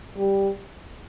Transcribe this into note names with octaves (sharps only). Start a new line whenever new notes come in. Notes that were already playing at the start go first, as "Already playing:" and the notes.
G3